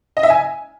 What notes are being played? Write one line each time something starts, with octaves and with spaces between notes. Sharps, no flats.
D#5
E5
G#5